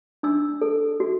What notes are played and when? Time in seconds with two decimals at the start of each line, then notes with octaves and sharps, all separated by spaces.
0.23 D4 E6
0.61 A4
1.00 F#4